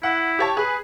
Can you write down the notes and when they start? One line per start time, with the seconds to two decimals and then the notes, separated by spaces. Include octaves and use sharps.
0.03 E4 F#5
0.39 G4 C#5 A5
0.57 G#4 B4